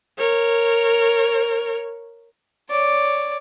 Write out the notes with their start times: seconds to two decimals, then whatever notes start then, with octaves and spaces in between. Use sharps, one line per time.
0.18 A#4 C#5
2.70 C#5 D5